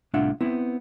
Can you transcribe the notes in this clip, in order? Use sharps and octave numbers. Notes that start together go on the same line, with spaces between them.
C2 A2 D4 F4 E5 F#5
B3 C4 E4